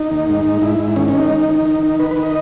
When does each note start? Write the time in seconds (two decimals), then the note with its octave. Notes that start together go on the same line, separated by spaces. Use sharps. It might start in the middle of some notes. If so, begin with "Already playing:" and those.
Already playing: D#4
0.11 D#2
0.28 G#2
0.45 G#2
0.62 G#2 E4
0.79 G#2
0.96 D#3 C#4
1.08 C#4
1.14 D#3
1.19 D#4
1.31 D#3
1.49 D#3
1.65 D#3
1.83 D#3
1.99 D#3 B4
2.11 B4
2.17 D#3
2.23 D#5